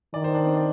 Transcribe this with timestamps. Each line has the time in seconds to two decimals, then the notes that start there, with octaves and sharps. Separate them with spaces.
0.14 D#3 D5
0.24 C5
0.34 D4
0.45 C4
0.55 D4